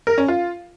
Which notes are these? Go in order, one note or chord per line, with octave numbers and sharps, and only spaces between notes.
A#4
C#4
F4